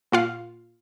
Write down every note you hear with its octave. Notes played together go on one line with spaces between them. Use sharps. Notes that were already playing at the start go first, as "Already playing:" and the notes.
A#2 F4 F5